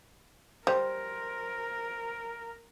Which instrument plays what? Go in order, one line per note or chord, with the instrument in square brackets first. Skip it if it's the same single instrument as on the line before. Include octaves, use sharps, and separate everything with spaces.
[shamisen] G3 [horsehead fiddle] A#4 [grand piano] C5